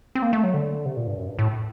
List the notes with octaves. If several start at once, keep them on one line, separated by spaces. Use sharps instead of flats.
C4
A#3
A3
F#3
D3
C3
A#2
G2
F#2
G2
A2